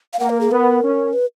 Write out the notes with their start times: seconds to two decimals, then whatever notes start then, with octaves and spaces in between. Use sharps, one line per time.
0.13 F5
0.19 A#3 F#5
0.30 A#4
0.41 G#4
0.51 B3 A#4
0.83 C#4
1.13 B4